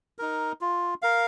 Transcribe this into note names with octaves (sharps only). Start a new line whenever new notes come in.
D#4 A#4
F4
A#4 F5